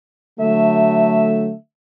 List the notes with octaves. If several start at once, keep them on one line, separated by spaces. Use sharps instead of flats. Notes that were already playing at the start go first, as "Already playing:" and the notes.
D3 F#3 A3 E5